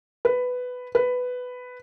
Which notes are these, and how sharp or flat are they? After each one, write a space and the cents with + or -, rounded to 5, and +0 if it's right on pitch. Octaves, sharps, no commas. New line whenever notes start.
B4 +10
B4 +10